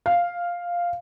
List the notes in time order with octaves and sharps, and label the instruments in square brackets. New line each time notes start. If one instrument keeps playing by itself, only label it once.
[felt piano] F5